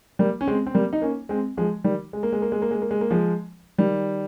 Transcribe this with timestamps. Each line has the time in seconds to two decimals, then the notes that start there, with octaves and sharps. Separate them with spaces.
0.19 G3 A#3
0.41 C#4
0.48 G#3 C4
0.67 C4
0.74 G3 A#3
0.93 D#4
1.02 A#3 C#4
1.29 G#3 C4
1.57 F3 G#3
1.84 D#3 G3
2.13 G#3
2.23 A#3
2.32 G#3
2.42 A#3
2.52 G#3
2.62 A#3
2.71 G#3
2.82 A#3
2.91 G#3
3.01 A#3
3.11 F3 G#3
3.78 D#3 G3